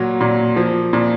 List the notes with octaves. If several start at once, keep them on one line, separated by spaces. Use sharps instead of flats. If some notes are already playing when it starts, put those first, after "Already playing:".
Already playing: A#2 F#3
A#2
F3
A#2